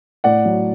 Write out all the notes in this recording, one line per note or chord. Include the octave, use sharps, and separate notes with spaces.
A2 D5 F#5
F#3